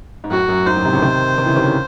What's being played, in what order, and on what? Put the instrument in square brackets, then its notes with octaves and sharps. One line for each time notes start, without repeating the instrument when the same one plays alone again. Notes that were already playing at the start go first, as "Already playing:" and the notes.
[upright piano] G#2
[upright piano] F#2 A2 [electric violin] F#4
[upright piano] F#2
[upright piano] G#2 [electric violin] C5
[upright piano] F#2 A2
G#2 C3
A2 C#3
C3 D#3
C3 D#3
C#3 E3
C3 D#3
C#3 E3